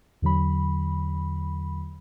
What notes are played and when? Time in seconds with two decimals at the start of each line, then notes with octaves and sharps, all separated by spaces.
0.22 E2 D3 F#3 B5